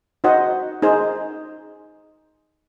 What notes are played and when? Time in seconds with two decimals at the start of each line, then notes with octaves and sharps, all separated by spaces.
0.24 D#4 F#4 C5 D#5 F#5
0.82 D#4 G#4 C5